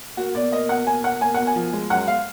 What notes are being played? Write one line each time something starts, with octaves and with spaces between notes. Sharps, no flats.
A#3 F#4
B2 D5
A#3 D#5
B2 F#5
A#3 G#5
B2 F#5
A#3 G#5
B2 F#5
G#5
F3
G#3
F#2 F#5
F5